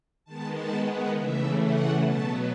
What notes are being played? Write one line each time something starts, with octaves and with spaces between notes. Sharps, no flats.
D#3 G#3 B3 A5
A5
F#5
C#3 E3 A3 E5
F#5
B2 F#3 B3 A5